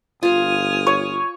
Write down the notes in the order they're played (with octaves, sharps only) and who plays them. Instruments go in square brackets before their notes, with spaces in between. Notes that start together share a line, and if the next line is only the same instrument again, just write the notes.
[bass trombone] G1 [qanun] F4 F5 [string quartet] G#5 D#6 F6
[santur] C#5